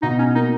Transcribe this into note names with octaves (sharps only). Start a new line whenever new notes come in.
B2 D#4
C#4
A#3 D#4